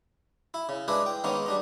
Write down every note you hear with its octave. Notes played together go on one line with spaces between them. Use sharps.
E4
C#3
G#3 D4 E4 G#4 B4
G5
D#3 G#3 A#3 B3 C#4 D#4
G3 D4 D#4